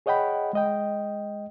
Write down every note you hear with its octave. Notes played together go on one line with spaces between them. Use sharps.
G#4 C#5 D#5 F#5 G5 B5
G#3 D#5 G5